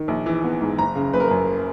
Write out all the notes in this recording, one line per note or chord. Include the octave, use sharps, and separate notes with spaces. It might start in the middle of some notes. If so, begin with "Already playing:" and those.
Already playing: D#3
A#1
E3
B3
G#2
F#1 A#5
C#3
F#1 B4
A#4
F#2 B4